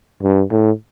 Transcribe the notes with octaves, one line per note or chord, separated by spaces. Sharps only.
G2
A2